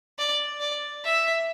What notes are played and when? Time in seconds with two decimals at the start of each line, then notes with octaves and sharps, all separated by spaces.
0.18 D5
0.60 D5
1.05 E5